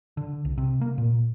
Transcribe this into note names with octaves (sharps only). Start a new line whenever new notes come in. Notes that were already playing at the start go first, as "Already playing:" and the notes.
D3
C2
C3
A#3
A#2